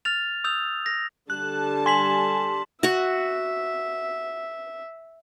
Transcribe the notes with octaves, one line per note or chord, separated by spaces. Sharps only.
F6 A6 F7
D#6 E6 G6 F7
A#6
D3 G3 A5 F#6
G#5 C6 B6 F#7
F#4 E5 F#5